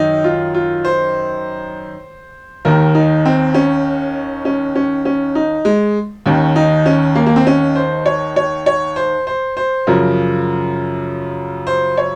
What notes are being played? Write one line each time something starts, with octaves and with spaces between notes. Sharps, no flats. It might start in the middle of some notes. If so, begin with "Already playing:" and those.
Already playing: F#2 D#3 D#4
F4
F4
C5
D#2 D#3 A#4
D#4
C4
C#4
C#4
C#4
C#4
D#4
G#3
D#2 D#3 C#4
D#4
C#4
A#3
A#3
C4
C#4
C5
C#5
C#5
C#5
C5
C5
C5
F#2 C#3 F3 A#4
C5
C#5